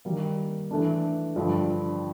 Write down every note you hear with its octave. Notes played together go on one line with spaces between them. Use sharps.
D#3 G3 A#3
E3 A3 D4
G2 D3 F3